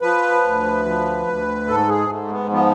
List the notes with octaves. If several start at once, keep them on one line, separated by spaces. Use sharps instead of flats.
F3 B4
D2
F3
D2
G#2 A4
G#4
G#2 A3
B3
F3 B3